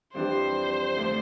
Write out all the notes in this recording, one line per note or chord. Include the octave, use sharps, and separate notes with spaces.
F2 E3 G3 D4 G4 C5
D2 D3 F3 A3